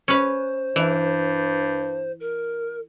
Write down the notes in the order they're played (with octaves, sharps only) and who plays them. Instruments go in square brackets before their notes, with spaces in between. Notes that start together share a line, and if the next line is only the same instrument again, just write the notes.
[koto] C#4 B4 [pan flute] C5
[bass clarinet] G2 [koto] E3
[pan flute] A#4